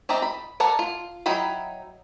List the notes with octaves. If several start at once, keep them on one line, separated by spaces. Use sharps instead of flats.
C4 D#4 D5 E5 A#5
B5
A4 A#4 D5 F#5
F4
F#3 D#4 E4 G5 B5